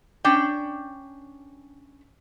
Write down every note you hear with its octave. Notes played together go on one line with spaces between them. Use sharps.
C#4 D4 G5